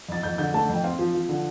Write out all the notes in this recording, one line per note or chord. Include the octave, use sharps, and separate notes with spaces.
F2 A6
F2 G6
D3 G6
A3 A5
F2
G5
C4 F5
F3
F3
D3